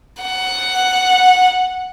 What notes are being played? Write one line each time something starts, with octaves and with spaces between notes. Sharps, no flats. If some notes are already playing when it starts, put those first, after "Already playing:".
F#5